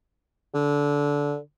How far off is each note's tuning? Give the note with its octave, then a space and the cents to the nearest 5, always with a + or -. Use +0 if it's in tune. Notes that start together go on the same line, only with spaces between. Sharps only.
D3 -20